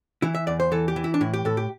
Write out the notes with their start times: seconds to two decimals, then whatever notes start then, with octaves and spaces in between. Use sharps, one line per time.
0.22 E3 E4
0.35 E5
0.47 E2 D5
0.60 C5
0.72 E3 A4
0.88 G4
0.96 E3
1.04 E4
1.14 D4
1.21 A2 E4
1.33 G4
1.45 A2 A4
1.57 G4